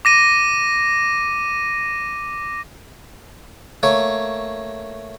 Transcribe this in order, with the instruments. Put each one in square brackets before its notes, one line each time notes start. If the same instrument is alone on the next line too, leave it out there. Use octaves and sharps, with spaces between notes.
[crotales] D6 A#6 D#7
[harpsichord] A3 A#3 C#5